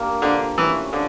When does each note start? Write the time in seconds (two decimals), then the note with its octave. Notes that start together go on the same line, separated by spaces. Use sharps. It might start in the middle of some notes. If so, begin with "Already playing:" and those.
Already playing: A#3 D4 G4
0.22 D3 F3
0.57 E3 A3 C#4
0.93 D3 F3